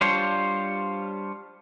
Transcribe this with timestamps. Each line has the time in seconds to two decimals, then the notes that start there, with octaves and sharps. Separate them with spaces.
0.01 G3 D4 F4 C5 C#5